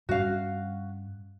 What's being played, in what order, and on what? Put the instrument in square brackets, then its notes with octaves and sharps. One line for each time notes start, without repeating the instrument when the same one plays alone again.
[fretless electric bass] G2 G3 C#4 [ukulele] F#4 F5